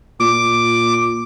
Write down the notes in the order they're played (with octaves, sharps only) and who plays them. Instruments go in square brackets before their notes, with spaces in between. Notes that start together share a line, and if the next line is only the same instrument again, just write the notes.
[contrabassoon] A#2 [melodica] D6